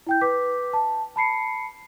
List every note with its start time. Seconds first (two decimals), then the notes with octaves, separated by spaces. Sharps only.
0.07 E4 G5 G6
0.21 B4 D6 B6
0.73 A5
1.16 A5 B5 C7 C#7